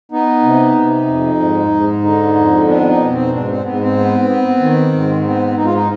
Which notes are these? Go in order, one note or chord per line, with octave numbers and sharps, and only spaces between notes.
B3 D#4
C3
C3
F2
G#2
G#2
D3 D#4
F2
B3 D4
D#4
B2
C4
G#2 D4
C4
G#2 B3
C4
B3
B3
D#3
G#2
B3 C4
G#2 D#4
F4
D#4